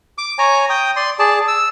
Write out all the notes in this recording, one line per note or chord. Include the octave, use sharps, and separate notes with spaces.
D6
C#5 G#5 A#5
G5 D#6
D5 C6
G#4 D5 A5
E6